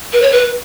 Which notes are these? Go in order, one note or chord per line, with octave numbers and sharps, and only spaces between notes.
B4
C#5
B4